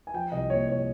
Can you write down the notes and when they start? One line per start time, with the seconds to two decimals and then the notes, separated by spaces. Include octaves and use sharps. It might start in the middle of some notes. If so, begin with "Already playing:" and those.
0.07 G#5
0.14 F3 G5
0.32 C2 D#5
0.50 A#2 C#5
0.68 C2 C#5